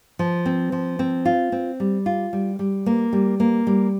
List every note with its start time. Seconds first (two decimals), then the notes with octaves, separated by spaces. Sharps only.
0.19 F3
0.46 C4
0.72 F3
0.99 C4
1.25 F4
1.52 C4
1.80 G3
2.06 F4
2.33 G3
2.59 G3
2.86 A#3
3.13 G3
3.40 A#3
3.67 G3